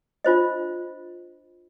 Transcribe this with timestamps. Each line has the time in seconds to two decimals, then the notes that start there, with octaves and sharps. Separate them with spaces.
0.24 D4 F4 C5 D#5